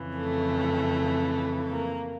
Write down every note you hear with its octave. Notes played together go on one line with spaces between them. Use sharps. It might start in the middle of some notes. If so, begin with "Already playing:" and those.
Already playing: F2 C#3 E3
A3
A#3